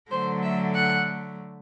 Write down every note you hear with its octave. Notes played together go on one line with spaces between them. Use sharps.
D3 F#3 A3 C5
E5
F#5